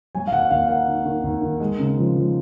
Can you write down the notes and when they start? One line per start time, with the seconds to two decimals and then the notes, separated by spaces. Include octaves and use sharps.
0.15 F#3 G#5
0.27 F5
0.32 D#2 F#5
0.51 D#2 F5
0.68 A#3 F#5
0.88 D#3
1.06 D#3
1.24 D#2
1.42 D#3
1.60 G#3
1.79 C#3
1.97 F3
2.16 F3